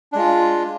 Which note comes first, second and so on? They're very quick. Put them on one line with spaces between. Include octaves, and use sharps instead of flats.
D4 G#3 F4